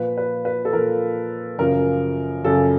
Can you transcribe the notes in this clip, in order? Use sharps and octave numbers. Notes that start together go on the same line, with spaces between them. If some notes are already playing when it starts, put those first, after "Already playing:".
Already playing: A#2 F3 B4
B4
B4
A4
A#2 F3 A#4
F#2 C#3 F3 A#4
F#2 C#3 F3 A4